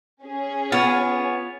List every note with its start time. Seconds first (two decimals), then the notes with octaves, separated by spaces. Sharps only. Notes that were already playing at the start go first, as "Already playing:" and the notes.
0.24 C#4 G#4
0.72 B3 F4 C#5